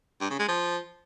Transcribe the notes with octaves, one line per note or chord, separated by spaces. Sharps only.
G2
C#3
G#3
F3